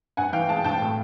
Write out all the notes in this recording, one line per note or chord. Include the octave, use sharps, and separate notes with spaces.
G2 F#5 G#5
E3 F5 G5
G#3 G5 A5
G2 G5 A5
A2